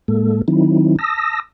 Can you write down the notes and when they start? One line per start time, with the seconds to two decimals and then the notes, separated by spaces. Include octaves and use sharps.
0.08 A2 G#3 A#3 A4
0.48 D#3 F#3 C4 D#4 E4
0.99 A5 D#6 E6 A#6